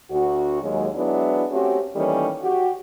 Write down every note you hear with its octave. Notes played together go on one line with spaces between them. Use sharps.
D2 F#4
D#2 F#3 G#3
F#3 G#3 B3 D4 E4
A3 C4 C#4 F#4 G4
D#3 E3 G3 A3 A#3 C#4
F#4 G4